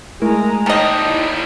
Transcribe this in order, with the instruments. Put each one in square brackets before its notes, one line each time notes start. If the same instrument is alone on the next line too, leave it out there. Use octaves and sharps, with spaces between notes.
[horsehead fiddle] G#3 A#5 [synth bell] A3 E4 A#4
[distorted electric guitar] D#2 G3 [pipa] D#3 D#5 [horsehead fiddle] C5 [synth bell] A5 F#6
[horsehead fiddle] D#4 E4